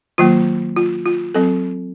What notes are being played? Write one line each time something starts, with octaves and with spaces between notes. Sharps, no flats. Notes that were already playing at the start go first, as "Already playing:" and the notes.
D#3 F#3 A#3 F4
F4
F4
F#3 C4 A4